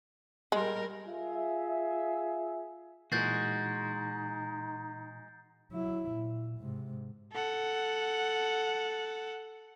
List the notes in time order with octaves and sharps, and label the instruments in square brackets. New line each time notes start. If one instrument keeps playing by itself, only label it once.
[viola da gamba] G3 A#4 [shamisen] G#3
[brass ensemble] F4 G#4 E5
[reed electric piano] A#2 E3 [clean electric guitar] G#3 F#4 [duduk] D#4 [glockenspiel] G6 A6 C7
[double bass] F#3 E4
A#2
G#2 C3
[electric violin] A4 F#5